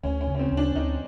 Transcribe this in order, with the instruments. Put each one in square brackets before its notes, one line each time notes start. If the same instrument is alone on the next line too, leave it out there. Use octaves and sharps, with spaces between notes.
[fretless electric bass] D2 [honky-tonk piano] C#4
[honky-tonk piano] C#4
[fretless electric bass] C#3
[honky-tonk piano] C#4
C4
[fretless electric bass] D2
[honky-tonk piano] D4
[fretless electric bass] D2 [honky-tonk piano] D#4